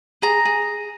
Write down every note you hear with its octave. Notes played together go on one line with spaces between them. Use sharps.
G#4 A#5
G#4